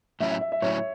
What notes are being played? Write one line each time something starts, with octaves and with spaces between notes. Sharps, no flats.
A2 F#3 C#4 E4 E5
E5
E5
E5
A2 F#3 C#4 E4 C#5